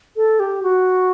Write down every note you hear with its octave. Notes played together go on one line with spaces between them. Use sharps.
A4
G4
F#4